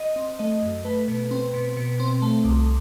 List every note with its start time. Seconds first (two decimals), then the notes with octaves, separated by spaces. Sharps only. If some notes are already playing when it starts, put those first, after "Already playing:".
Already playing: D#5
0.16 C4
0.39 A3 D#5
0.63 F#2
0.85 A3 B4
1.08 B2
1.31 C4
1.54 B2
1.77 B2
2.00 C4
2.22 A3
2.45 C2